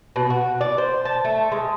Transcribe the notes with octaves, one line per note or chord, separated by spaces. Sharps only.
B2
F#4
D5
C5
A5
A3
G#3